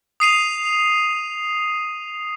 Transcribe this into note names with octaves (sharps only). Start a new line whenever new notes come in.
D#6 C7 D#7 F7